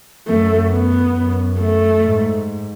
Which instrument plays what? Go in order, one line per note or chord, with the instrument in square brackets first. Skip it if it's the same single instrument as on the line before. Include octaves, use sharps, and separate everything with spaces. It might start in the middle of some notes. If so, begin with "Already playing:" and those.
[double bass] F#2 [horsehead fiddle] A3
[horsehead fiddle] B3
[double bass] F#2
[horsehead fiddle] A3
[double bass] G#2